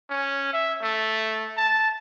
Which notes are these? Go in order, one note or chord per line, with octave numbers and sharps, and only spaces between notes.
C#4
E5
A3
A5